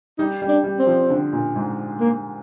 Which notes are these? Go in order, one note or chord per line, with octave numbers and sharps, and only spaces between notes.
G3 D#4
G3
D4
G3
C4
F3
D3
A#2
G#2
A#3